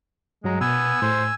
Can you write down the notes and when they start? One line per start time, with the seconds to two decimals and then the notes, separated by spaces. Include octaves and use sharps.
0.44 G2 F#3 G#3 A#5
0.61 B2 B3 G#5 E6
1.02 A2 C5